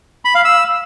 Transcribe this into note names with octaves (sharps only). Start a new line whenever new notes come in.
B5
F5
E6